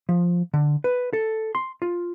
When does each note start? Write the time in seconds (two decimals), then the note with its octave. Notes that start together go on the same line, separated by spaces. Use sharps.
0.09 F3
0.54 D3
0.84 B4
1.13 A4
1.55 C6
1.82 F4